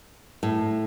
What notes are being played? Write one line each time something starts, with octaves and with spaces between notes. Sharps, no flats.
A2